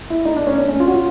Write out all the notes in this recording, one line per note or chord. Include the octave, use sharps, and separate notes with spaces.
E4
D#4
D4
C#4
C#4
C#4
F4
F#4
F4